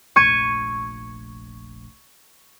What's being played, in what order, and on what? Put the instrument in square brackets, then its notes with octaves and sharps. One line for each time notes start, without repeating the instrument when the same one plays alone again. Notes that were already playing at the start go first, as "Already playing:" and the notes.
[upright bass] F1 A#1 [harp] C#6 G#6 D#7